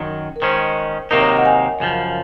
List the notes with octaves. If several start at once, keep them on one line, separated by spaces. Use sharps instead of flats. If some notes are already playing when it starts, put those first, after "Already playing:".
Already playing: F#2 D#3 F#3
A#4
D#3 G#3 C#4 C5
C3 D#3 F#3 A#3 D#4 A#4
C#5
D#5
F#5
G#5
F#2 C#3 F3